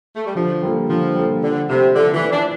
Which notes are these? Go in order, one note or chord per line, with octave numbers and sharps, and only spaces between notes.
A3
G3
D3 F3
G3 A#3 F4 A4
D3 F3
G3 A#3 F4 A4
D3 F3
C3 A3 E4
D3 F3
E3
A3 E4
D4